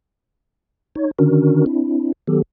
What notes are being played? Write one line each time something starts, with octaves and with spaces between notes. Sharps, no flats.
D#4 C#5
D3 D#3 C#4 D4 F#4 A#4
C4 D4 E4
D#3 F#3 B3 G4 A4